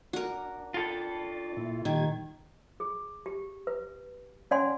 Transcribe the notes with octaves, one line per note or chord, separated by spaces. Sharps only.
D4 F#4 A#4
F4 A4
A#2 E4
A#2 D#3 G3 G#6
G#4
G4
B4
C#4 C#5 D5 F#5 G#5 C6